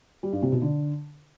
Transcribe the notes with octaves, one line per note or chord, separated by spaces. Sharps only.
G3
G2
C3
B2
D3